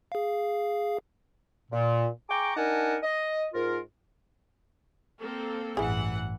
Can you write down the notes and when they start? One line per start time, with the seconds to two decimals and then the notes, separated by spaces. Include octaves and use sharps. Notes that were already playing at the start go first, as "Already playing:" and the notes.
0.12 G#4 F5
1.71 A#2
2.29 G#4 G5 A#5 C#6 D6
2.57 D4 D#4 A#4 F#5 G#5 A5
3.03 D#5
3.54 G#2 F4 A#4
5.20 A#3 C4 A4
5.77 A1 G2 E3 E4 G#4 F#5